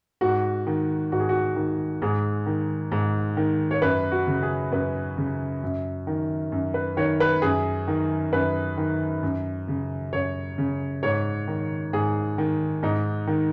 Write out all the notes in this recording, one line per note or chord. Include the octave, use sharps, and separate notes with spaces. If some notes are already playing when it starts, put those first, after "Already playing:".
G#2 F#4
D#3
G#2 F#4
G#4
F#4
D#3
G#2 G#4
D#3
G#2
D#3
C#5
F#2 B4
F#4
C#3
G#4
F#2 B4
C#3
F#2
D#3
F#2
B4
D#3 C#5
B4
F#2 G#4
D#3
F#2 B4
D#3
F#2
C#3
F#2 C#5
C#3
G#2 C#5
D#3
G#2 G#4
D#3
G#2 D#4
D#3